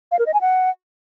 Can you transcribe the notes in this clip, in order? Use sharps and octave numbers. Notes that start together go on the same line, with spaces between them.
F5
A#4
D#5
G#5
F#5